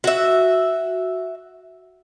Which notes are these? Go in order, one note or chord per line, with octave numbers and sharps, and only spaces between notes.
F#4 E5